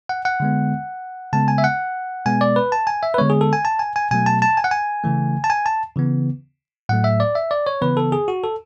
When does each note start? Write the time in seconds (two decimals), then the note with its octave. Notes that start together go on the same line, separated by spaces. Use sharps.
0.09 F#5
0.25 F#5
0.40 D3 G#3 B3
1.33 C#3 G#3 B3 A5
1.48 G#5
1.58 E5
1.64 F#5
2.26 B2 G#3 B3 G#5
2.41 D5
2.56 B4
2.72 A5
2.87 G#5
3.03 E5
3.14 B4
3.18 D3 G#3 B3 C#5
3.30 G#4
3.41 A4
3.53 G#5
3.65 A5
3.79 G#5
3.96 G#5
4.11 B2 F#3 A3 G#5
4.26 A5
4.42 A5
4.57 G#5
4.64 F#5
4.71 G#5
5.04 C#3 E3 A3
5.44 A5
5.50 G#5
5.66 A5
5.96 C#3 E3 B3
6.89 A2 F#3 A3 F#5
7.04 E5
7.20 D5
7.35 E5
7.51 D5
7.67 C#5
7.82 C#3 E3 B3 B4
7.97 A4
8.12 G#4
8.28 F#4
8.44 A4